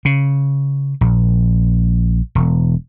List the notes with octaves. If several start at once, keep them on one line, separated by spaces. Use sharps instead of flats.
C#3
A#1
E1